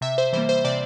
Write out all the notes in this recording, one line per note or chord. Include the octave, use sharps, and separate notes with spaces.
C3 E5
C5
E3 G3 A#3 C5
C5
C3 D5